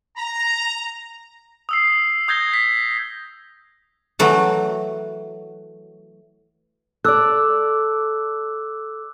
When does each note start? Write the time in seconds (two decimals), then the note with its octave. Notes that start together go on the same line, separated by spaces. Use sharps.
0.17 A#5
1.69 D#6 E6 C7
2.28 D#6 G6 G#6 A#6 G7
2.54 B6
4.19 E3 F#3 A3 F#4
7.05 A4 D5 D6 E6 F#6